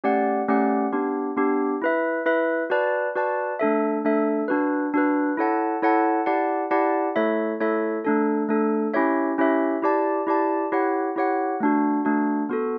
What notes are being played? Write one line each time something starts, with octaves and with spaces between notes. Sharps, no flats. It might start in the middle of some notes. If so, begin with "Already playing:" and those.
A3 C#4 G4 D5 F#5
A3 C#4 G4 D5 F#5
B3 D4 G4
B3 D4 G4
E4 B4 E5
E4 B4 E5
F#4 B4 D5 A5
F#4 B4 D5 A5
A3 D4 A4 E5
A3 D4 A4 E5
D4 F#4 B4
D4 F#4 B4
E4 A4 C#5 F#5 A5
E4 A4 C#5 F#5 A5
E4 G4 D5 F#5 A5
E4 G4 D5 F#5 A5
A3 E4 A4 C#5 E5
A3 E4 A4 C#5 E5
A3 D4 A4
A3 D4 A4
C#4 E4 G4 C#5 E5
C#4 E4 G4 C#5 E5
E4 G4 D5 A5
E4 G4 D5 A5
E4 G4 C#5 F#5
E4 G4 C#5 F#5
A3 D4 F#4
A3 D4 F#4
B3 F#4 A4